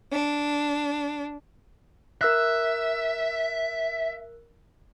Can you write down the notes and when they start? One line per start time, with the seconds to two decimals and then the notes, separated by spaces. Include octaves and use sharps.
0.12 D4
2.21 A#4 E5 E6 F#6